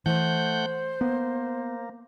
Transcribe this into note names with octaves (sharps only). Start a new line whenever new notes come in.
E3 A3 C5 F#5 G6
A#3 B3